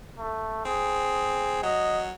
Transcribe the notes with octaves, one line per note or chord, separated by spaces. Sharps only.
A3
C4 G#4
F#3 D#5